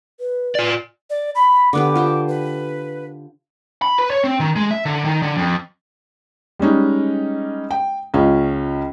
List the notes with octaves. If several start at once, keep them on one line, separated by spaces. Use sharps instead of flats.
B4
F4 D5
D5
B5
D3 B3 G4 D6
F4 G4 C5
B4
B5
B4
C#5
C4
D#3
G#3
E5
D3
D#3
D3
F2
G3 G#3 C#4 D#4
G5
C#2 C#4 F4